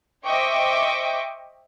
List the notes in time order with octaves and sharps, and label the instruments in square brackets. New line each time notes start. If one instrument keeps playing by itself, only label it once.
[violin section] C5 D#5 E5 G5 C#6 D6